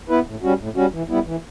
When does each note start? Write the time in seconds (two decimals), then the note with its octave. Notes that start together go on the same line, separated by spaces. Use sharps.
0.09 B3 E4 B4
0.26 A2
0.42 G3 C#4 F#4
0.59 A2
0.76 G3 C#4 F#4
0.93 E3
1.09 G3 B3 E4
1.26 E3